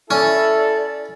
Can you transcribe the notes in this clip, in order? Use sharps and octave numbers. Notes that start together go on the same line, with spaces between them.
C#4 E4 A4 D5